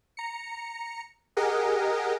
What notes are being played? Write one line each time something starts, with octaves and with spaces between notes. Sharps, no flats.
A#5 C#7
G4 G#4 A#4 D#5 F#5